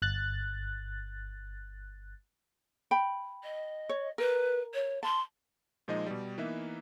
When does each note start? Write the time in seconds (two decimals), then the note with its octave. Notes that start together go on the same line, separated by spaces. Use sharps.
0.02 G1 F#6 A6
2.91 G5 B5
3.43 D#5
3.89 C#5
4.18 A#4 B4
4.74 C#5
5.03 A5 C6
5.88 A#2 F3 G#3 D#4 D#5
6.06 B2 G3
6.38 E3 A#3 B3 D#4 B4 E5